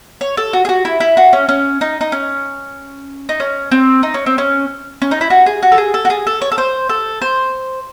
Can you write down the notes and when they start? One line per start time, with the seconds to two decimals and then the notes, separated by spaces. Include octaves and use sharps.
0.21 C#5
0.37 A4
0.53 F#4
0.65 G#4
0.69 F#4
0.85 E4
1.00 E4
1.17 F#4
1.33 C#4
1.49 C#4
1.81 D#4
2.01 D#4
2.12 C#4
3.29 D#4
3.40 C#4
3.71 C4
4.03 D#4
4.14 C#4
4.26 C4
4.38 C#4
5.02 C#4
5.11 D#4
5.21 E4
5.30 F#4
5.46 G#4
5.63 F#4
5.72 A4
5.78 G#4
5.94 A4
6.05 F#4
6.10 G#4
6.27 A4
6.42 C#5
6.52 A4
6.58 C5
6.89 A4
7.22 C5